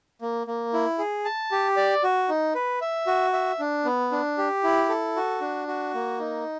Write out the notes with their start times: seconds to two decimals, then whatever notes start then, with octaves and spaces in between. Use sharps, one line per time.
0.21 A#3
0.47 A#3
0.74 E4
0.98 G#4
1.25 A5
1.52 G4
1.77 D5
2.03 F#4
2.29 D#4
2.55 B4
2.81 E5
3.07 F#4
3.33 E5
3.60 D4
3.85 B3
4.12 D4
4.38 G4
4.63 E4
4.89 A4
5.16 F#4
5.41 D4
5.68 F#4
5.94 A#3
6.19 D#4